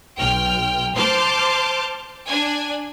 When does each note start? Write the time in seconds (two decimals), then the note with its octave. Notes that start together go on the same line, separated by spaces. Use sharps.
0.16 B1 G5 F6
0.96 C5 A5 C6 D6 F6
2.28 D4 G#5